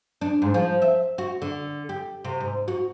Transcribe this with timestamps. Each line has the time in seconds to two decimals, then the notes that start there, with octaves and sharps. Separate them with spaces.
0.21 D4
0.42 G#2
0.54 F3
0.82 E5
1.18 F#4
1.42 D3
1.89 G4
2.24 C3
2.40 G#2
2.68 F#4